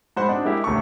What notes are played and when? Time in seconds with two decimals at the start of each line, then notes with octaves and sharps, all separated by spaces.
0.17 G#2 F#4 C5 F#5 B5
0.29 C4 D4 D#4 F#4
0.45 G#3 A#3 E4 G4
0.64 D#1 D2 A3 A4 C#6